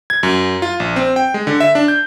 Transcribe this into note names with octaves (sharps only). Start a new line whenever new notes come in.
G#6
F#2
F4
A#1
C4
G5
G#3
D3
E5
D4
G6